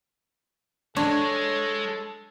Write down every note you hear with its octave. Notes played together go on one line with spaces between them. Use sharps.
G#3 D4 A4 C#5